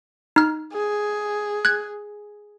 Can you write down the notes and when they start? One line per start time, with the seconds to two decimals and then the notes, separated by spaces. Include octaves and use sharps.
0.36 D#4 F6
0.72 G#4
1.65 F#6 G#6